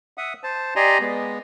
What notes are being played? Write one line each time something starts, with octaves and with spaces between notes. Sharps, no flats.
E5 F#5 D#6
C5 A5
G4 D5 D#5 G#5 A#5 C6
G#3 B3